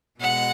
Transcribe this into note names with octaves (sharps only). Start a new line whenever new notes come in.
B2 G#3 F#5